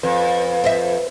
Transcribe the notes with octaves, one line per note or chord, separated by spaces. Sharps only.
F2 B4
C5 D#5 E5